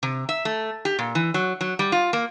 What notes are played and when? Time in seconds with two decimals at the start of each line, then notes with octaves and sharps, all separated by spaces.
0.03 C3
0.29 E5
0.45 A3
0.85 G4
0.99 A#2
1.15 E3
1.34 F#3
1.61 F#3
1.79 G3
1.92 F4
2.13 A#3